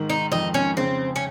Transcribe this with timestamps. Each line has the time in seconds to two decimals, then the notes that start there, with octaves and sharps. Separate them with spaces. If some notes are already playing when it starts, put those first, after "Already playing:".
Already playing: G#2 D#3
0.10 D#4
0.32 F2 D#4
0.54 C#4
0.77 C#3 C4
1.16 C#4